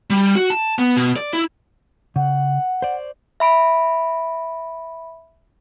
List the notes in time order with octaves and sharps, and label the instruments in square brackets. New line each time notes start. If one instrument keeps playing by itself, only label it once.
[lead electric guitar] G3
F#4
A5
B3
B2
D5
E4
[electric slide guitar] C#3 [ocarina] F#5
[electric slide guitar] C5 D5
[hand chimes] E5 B5 D7